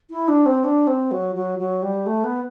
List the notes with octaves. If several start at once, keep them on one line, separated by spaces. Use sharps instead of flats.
E4
D4
C4
D4
C4
F#3
F#3
F#3
G3
A3
B3